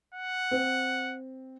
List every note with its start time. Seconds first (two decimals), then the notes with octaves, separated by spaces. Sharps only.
0.14 F#5
0.51 C4